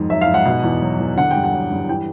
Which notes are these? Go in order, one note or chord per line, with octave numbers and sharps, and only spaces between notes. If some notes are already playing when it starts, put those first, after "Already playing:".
Already playing: F2 G#2 D#3
F#3 E5
F5
G#2
F#5
B2
E2
F#3
E2
D3 F#5
G2 G5
F#5
F#3
G2
E3 G5